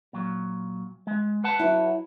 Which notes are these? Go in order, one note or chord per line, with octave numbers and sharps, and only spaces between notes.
A#2 F#3
G#3
B4 F#5 A5
F#3 E4